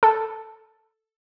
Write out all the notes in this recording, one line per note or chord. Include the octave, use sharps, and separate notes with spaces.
A4